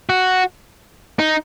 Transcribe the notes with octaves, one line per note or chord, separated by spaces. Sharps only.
F#4
D#4